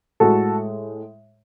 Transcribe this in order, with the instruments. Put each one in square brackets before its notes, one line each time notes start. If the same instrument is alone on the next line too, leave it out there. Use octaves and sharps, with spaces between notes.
[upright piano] A2 G#3 F#4 A4